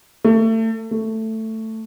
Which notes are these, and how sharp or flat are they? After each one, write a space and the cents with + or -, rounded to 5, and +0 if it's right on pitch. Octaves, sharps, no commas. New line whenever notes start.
A3 +30
A3 +10